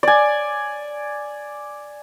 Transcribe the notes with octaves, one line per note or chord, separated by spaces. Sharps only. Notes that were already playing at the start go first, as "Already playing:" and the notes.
D5 G#5